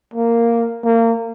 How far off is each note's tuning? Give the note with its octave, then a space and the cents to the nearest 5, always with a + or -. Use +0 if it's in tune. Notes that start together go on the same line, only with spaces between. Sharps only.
A#3 -5
A#3 -30